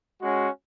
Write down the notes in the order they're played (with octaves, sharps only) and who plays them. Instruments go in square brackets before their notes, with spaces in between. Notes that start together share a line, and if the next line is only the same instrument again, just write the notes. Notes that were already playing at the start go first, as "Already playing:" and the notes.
[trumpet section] G#3 C#4 F#4